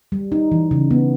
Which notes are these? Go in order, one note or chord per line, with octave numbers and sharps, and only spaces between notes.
G3
D#4
E3
C#3
B3